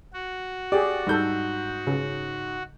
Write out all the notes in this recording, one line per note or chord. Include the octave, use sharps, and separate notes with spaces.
F#4
G4 G#4 D5
G#2 G3 A4 G6
C#3